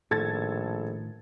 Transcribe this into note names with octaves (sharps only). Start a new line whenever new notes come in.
A#1 A2 D#3 A4 G#6 A6